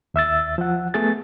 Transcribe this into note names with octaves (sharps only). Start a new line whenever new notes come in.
D#2 E5 E6 A6
F3 F#5
A3 B3 G#4 A6